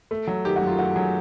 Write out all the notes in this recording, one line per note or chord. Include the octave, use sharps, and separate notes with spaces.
A3
F#3
D#3 G4
F#4
F#2
F4
A3 F#4
F#3 G#4